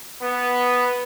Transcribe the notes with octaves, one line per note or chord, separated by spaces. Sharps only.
B3